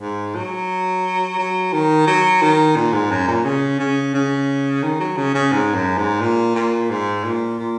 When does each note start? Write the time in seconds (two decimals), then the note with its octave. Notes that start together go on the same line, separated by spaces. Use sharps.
0.01 G#2
0.35 F#3
1.39 F#3
1.73 D#3
2.07 F#3
2.42 D#3
2.76 A#2
2.93 G#2
3.11 F#2
3.28 A#2
3.45 C#3
3.79 C#3
4.14 C#3
4.83 D#3
5.00 F#3
5.17 C#3
5.35 C#3
5.52 G#2
5.75 F#2
5.98 G#2
6.21 A#2
6.55 A#2
6.90 G#2
7.24 A#2
7.59 A#2